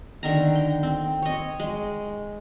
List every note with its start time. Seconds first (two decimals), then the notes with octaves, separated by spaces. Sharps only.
0.23 D3 D#3 A#5
0.55 G5
0.83 C4
1.22 C#5 D#5
1.60 G#3